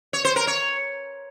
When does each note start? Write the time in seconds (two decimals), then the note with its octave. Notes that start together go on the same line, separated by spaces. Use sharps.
0.13 C#5
0.25 C5
0.36 A#4
0.47 C#5